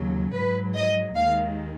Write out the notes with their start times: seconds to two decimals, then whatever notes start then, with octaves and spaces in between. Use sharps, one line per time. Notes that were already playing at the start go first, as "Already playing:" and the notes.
Already playing: D#2 C#3 F#3
0.34 G#2 F#3 B4
0.75 D#5
1.16 D#2 D#3 G#3 F5